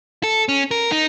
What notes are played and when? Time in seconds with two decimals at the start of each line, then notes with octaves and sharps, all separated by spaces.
0.23 A4
0.49 C#4
0.71 A#4
0.92 D#4